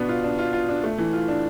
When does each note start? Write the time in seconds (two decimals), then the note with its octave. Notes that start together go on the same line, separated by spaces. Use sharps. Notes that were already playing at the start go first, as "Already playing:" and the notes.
Already playing: B2 B3 D4
0.09 F4
0.23 D4
0.39 F4
0.53 F4
0.69 D4
0.84 A3
0.98 E3
1.13 F4
1.28 D4